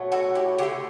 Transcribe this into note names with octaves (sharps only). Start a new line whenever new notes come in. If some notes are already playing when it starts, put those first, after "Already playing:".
Already playing: B2 F#3 A3
F#4 A4
E4 G4
D3 A3 E4 G4